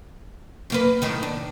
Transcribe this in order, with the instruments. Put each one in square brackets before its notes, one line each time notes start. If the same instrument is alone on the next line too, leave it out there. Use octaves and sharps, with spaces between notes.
[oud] F#2 A#3 B4
F#2 A2 D#3
D4